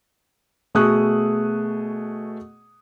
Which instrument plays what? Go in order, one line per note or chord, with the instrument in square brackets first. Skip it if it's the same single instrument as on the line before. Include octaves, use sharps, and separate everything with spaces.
[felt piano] B2 A3 G#4 C#6 D#6 F#6